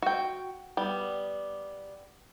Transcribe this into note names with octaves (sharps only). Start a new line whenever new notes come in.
F#4 G5
G3 B3